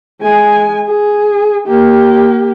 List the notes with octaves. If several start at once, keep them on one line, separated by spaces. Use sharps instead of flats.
G#3 G#5
G#4
A#3 G4